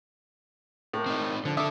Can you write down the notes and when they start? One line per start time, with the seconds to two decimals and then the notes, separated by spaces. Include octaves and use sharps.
0.93 A2 A#3
1.06 C4 D#4
1.45 D3 F3
1.57 D4 A4 E5 D6 D#6